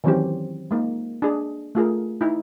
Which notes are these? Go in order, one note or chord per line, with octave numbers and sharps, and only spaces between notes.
D#3 E3 F#3 C4 C#4 G4
G#3 A#3 D#4
D4 G#4
A3 F4 G#4 A#4
D#4 E4